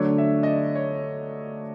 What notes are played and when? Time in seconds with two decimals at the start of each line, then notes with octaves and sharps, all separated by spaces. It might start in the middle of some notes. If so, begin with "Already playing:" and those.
Already playing: D3 F#3 A3 D4 C#5
0.18 E5
0.43 D#5
0.47 D5
0.75 C#5